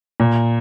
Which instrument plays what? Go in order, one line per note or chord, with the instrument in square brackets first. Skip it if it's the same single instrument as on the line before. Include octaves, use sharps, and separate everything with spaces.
[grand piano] A#2